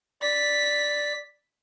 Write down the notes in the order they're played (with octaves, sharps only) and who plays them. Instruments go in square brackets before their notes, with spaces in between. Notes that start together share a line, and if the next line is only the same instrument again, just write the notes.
[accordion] D5 [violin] B6